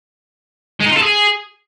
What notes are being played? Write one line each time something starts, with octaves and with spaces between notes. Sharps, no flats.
G#3
D#4
F4
A4
G#4